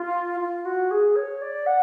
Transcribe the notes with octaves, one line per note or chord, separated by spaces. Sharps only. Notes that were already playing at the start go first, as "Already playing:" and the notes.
Already playing: F4
F4
F#4
G#4
C#5
D5
F#5